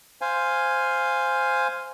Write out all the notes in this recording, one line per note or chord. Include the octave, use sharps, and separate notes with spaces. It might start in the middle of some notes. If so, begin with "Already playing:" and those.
C5 F5 G#5